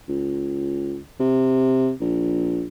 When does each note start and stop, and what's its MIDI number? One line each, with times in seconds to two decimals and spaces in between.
0.09 0.98 37
1.20 1.91 48
2.01 2.67 34